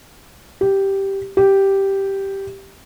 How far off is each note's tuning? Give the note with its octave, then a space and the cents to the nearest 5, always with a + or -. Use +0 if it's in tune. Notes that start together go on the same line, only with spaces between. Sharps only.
G4 -5
G4 -5